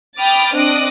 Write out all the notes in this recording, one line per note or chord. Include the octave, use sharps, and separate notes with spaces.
G5 B5 D6 D#6 F6 A6
C4 D4 D#5 D6 D#6 F#6